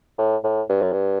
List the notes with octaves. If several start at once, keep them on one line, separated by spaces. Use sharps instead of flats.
A2
A2
G2
F#2
G2